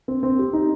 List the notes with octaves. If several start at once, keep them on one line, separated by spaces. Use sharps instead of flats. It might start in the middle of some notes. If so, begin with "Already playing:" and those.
C4
C4
G4
D#4